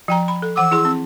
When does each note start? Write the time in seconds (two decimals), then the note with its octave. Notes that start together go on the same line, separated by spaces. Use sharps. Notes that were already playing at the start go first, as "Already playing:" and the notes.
0.08 F3 G5 A#5
0.28 B5
0.42 A4
0.56 E3 F#5 D6 E6
0.71 E4 G#4 C6
0.85 C4